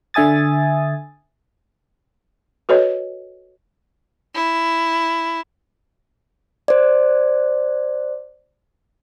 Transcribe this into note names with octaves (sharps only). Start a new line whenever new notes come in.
D3 E5 G#5 D#6 A6
F#4 A4 B4 C#5 D#5
E4
C5 D5